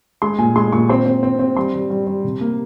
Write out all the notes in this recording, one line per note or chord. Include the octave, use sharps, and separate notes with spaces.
G#3 C6
A#2 G#5
G#3 C6
A#2 C#6
C4 C6
C4
C4
C4
G3 C6
G3
G3
G3
C3
A#3